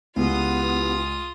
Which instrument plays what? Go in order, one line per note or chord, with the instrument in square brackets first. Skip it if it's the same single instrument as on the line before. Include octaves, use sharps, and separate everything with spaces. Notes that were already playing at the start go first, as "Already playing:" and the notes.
[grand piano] C#2 [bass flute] B3 [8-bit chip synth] E4 G4 [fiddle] F4 D#6